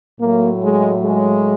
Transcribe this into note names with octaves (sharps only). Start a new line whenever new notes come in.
A2 F#3 A#3
G#3
G#3